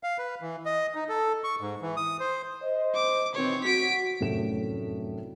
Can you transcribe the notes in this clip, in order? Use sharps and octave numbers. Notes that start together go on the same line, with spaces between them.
F5
B4
E3
D#5
D#4
A4
C#6
G#2
E3
D#6
C5
C5 D#5
D6
B2 D#3 E3 C4 C#5
F#4 B6 D7
F1 F#2 A2 F#3 E7